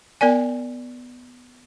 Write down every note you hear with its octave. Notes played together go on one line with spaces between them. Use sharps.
B3 A#4 D5 G#5